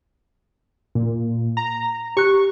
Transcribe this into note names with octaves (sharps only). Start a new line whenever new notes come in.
A#2
A#5
G4 C#6 F#6